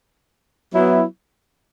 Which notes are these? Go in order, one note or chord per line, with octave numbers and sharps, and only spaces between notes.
F#3 B3 E4